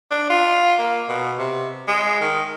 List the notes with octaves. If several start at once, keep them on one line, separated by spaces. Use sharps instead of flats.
D4
F4
A#3
B2
C3
G#3
D#3